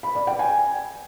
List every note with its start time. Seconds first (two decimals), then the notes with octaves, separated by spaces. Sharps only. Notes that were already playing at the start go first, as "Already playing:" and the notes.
0.03 B5
0.15 D5
0.27 G5
0.39 G#5